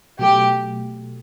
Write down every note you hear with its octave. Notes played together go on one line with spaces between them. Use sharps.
B2 F#3 A3 G4